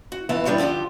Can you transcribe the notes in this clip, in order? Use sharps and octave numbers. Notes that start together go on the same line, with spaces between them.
F#4
F2 E3 B3 E5 A5
E3 F#3 G3 B3 D4
G2 D3 F3 F4 G4